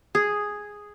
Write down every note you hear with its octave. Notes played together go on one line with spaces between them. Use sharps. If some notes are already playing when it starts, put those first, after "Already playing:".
G#4